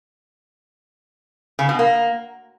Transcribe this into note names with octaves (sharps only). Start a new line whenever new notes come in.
C#3
B2
A#3